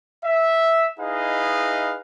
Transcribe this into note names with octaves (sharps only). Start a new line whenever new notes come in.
E5
D#4 E4 G#4 B4 D#5 F5